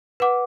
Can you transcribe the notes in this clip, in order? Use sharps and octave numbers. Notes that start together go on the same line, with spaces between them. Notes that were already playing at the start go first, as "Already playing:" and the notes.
B4 F#5 D6